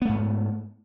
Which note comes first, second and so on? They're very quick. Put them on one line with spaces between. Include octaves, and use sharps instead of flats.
B3 A3 G#2